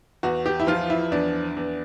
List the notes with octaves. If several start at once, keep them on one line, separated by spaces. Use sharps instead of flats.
E2 F#4
G4
E4
F3 F4
E4
E2 D4
E2